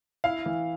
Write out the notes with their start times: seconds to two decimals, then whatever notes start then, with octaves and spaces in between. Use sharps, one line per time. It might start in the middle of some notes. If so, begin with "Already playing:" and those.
0.24 E4 F5
0.46 E3